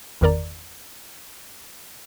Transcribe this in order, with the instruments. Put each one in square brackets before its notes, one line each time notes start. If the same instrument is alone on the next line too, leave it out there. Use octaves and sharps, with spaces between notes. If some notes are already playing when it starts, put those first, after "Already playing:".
[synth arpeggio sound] G1 E2 D#3 A#4 D5 A#5